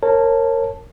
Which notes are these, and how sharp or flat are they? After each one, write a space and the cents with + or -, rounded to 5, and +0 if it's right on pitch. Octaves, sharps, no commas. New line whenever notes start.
A#4 -15 C#5 -30 A5 +0